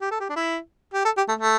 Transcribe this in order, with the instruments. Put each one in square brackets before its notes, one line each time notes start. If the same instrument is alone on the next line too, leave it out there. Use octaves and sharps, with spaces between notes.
[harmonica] G4
A4
G4
D4
E4
G4
A4
G4
A3
A3